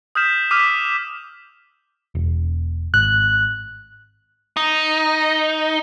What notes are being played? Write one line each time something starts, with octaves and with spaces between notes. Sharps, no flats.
D#6 F6 G6 B6 E7
D6 E6 F6 B6 D#7 E7
E1
G#1 F#6
D#4